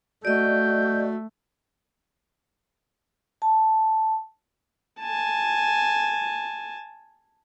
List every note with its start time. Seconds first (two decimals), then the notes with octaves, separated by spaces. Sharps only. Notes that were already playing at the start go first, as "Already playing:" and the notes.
0.25 A3 F#4 D5 D#5 G6
3.42 A5
5.00 G#5 A5